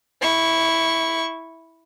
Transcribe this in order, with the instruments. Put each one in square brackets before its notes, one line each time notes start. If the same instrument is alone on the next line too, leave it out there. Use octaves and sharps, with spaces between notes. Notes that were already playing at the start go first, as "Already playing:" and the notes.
[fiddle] E4 C#6